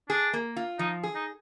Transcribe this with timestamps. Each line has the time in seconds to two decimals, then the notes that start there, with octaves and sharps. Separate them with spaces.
0.09 D4 G#4
0.33 A#3
0.56 F4
0.79 F3 D#4
1.03 G#4
1.15 D#4